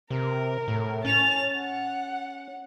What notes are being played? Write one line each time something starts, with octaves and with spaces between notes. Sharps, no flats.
C3 A#4
A2
C#4 A5 F7
F#5